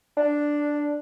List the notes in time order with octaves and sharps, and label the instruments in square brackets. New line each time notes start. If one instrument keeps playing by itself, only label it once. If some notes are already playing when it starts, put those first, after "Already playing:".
[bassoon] D4